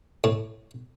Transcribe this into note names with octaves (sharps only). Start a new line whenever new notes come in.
A2